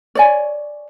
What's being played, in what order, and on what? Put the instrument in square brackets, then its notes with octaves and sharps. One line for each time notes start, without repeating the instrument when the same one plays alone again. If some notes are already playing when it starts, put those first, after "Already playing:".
[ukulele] C#5 D5 G#5